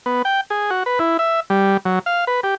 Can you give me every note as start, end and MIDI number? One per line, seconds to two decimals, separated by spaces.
0.06 0.22 59
0.25 0.41 79
0.50 0.70 68
0.70 0.83 66
0.86 0.99 71
0.99 1.17 64
1.19 1.40 76
1.50 1.77 55
1.85 1.99 54
2.06 2.25 77
2.27 2.40 71
2.43 2.55 67